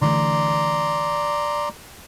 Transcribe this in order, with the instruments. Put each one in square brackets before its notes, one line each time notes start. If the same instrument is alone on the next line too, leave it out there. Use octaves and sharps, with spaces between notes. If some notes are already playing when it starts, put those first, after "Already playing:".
[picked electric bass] D3 E3 A3 [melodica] D5 A#5 C6